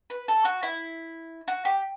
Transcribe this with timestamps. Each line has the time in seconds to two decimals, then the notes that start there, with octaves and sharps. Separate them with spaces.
0.10 B4
0.28 A4
0.45 F#4
0.63 E4
1.48 F#4
1.65 G4